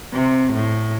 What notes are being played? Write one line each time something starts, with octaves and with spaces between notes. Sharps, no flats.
C3
A2